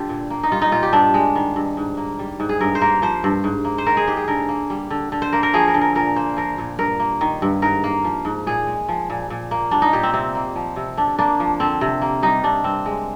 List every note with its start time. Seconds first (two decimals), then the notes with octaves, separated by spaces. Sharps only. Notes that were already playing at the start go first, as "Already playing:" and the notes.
Already playing: D3 G3 F4 G4
0.09 A#2
0.30 A#3
0.43 D#4
0.52 G3 F4
0.62 D#4
0.72 A#2 F4
0.83 G4
0.93 G2 D4
1.14 G#3
1.35 D#3
1.56 G2
1.77 G#2
1.97 A#3
2.19 G3
2.40 G#2
2.49 G#4
2.61 G2 A#4
2.75 C5
2.81 A#3 A#4
3.02 F3 C5
3.24 G2
3.44 G#2
3.65 A#3
3.78 C5
3.86 D#3 A#4
3.97 G#4
4.07 G#2 G4
4.17 G#4
4.28 D3 A#4
4.49 A#3
4.70 G3
4.90 D3
5.12 D3
5.22 C5
5.33 A#3 A#4
5.43 A#4
5.54 F3 G#4
5.68 A#4
5.74 D3
5.81 A#4
5.95 A#2 A#4
6.16 A#3 C5
6.37 F3 A#4
6.58 A#2
6.79 G2 A#4
7.00 A#3
7.21 D#3
7.42 G2
7.62 G#2 A#4
7.84 A#3
8.04 F3
8.25 G#2
8.47 A#2 G#4
8.67 G#3
8.89 F3
9.10 A#2
9.30 A#2
9.51 A#3
9.71 G3 D4
9.82 D#4
9.93 A#2 G4
10.03 C4
10.14 C3 C4
10.35 A#3
10.56 F3
10.76 C3
10.97 D3 D4
11.19 A#3 D4
11.40 F3
11.60 D3 C4
11.81 C3
12.02 A#3
12.23 G3 D#4
12.44 C3 D4
12.64 G2 C4
12.86 G#3